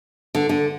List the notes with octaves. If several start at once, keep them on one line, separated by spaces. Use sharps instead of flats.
D3
D3